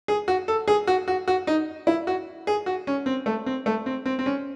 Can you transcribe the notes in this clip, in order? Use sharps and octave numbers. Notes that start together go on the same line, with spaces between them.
G#4
F#4
A4
G#4
F#4
F#4
F#4
D#4
E4
F#4
G#4
F#4
C#4
C4
A3
C4
A3
C4
C4
C4
C#4